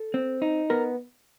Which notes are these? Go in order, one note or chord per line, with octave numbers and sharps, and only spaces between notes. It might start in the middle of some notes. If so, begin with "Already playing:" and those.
Already playing: A4
C4
D#4
B3 A#4